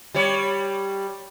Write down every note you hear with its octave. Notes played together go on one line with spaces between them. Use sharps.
G3 C#5